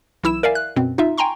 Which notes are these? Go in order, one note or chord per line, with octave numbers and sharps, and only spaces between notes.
B1 E3 E4 E6 E7
A#4 D5 E5 F5 G#5
F#6
F#2 B2 C4
D#4 F4 E5
G5 G#5 A#5 C6 C#6